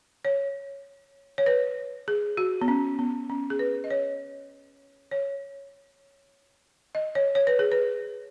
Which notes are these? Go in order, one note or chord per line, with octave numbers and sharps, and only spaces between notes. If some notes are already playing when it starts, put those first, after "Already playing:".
C#5
C#5
B4
G#4
F#4
B3
C#4
B3
C#4
G#4
B4
D#5
C#5
C#5
D#5
C#5
C#5
B4
G#4
B4